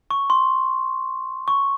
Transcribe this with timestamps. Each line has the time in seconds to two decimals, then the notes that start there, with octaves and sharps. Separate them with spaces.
0.11 C#6
0.30 C6
1.48 C#6